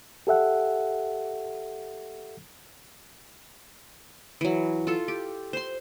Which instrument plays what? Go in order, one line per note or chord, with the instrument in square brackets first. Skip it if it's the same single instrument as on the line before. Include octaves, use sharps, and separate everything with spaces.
[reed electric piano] G4 A4 E5 F#5
[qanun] E3 F#3
F4 A4
G4
C5 C6